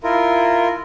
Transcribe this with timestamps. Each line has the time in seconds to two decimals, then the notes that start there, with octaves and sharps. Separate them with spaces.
0.03 E4 F4 A#4